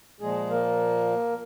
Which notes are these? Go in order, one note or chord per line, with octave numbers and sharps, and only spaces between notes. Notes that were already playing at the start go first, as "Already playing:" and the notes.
A#2 F3 G#3 G#4
A#3 A#4